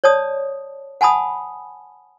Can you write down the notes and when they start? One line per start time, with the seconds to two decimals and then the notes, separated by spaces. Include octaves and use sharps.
0.04 C#5 D5 A5 D#6
1.01 F#5 G#5 A5 B5 D#6